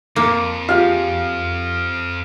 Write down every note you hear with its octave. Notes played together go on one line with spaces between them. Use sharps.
F2 A#3
F4 G4 G#4 F5